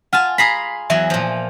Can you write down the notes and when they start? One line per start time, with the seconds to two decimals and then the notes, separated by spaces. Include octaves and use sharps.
0.13 F4 F#5 G#5 A5 F6
0.38 G#4 A#5 B5 B6 C7
0.90 E2 F#3 E5 G#5
1.10 A#2 F3